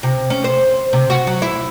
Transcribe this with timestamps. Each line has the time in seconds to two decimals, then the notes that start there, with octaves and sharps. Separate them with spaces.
0.03 C3
0.30 C#4
0.44 C5
0.93 C3
1.10 F#4
1.27 F#3
1.42 E4